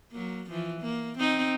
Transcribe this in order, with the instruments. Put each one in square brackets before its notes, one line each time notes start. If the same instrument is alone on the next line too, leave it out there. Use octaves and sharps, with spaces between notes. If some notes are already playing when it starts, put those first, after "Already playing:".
[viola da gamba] F#3 A#3
E3 F3
A#3
C4 D#4